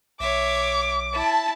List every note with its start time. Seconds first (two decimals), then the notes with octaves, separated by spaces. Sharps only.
0.20 B1 C#5 E5 D6
1.13 E4 A5